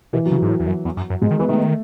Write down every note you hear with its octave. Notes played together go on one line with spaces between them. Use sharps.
B2 E3
F#3
C#3
G#2 F#3
A2
E2
F#2
E2
F#2
F#2
G#2 G#3
D#3
E3 B3
D#3 A3